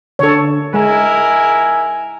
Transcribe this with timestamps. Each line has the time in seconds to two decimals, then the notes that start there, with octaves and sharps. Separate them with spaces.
0.19 D3 A4 C#5
0.74 G#3 E4 A#4 G#5